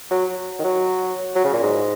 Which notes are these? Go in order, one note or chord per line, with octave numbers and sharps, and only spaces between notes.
F#3
D#3
F#3
F#3
C#3
A#2
G#2